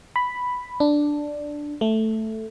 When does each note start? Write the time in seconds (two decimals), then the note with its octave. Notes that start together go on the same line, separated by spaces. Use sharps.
0.16 B5
0.80 D4
1.81 A3